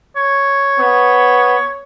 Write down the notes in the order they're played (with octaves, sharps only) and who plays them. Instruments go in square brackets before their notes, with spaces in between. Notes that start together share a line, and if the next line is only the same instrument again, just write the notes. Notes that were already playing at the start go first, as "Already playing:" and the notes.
[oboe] C#5
[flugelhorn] B3